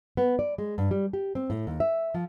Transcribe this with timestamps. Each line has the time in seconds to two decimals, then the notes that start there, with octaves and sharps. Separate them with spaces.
0.17 B3
0.39 D5
0.58 G#3
0.78 G2
0.91 G3
1.13 G4
1.35 C4
1.50 A2
1.67 D#2
1.80 E5
2.14 F3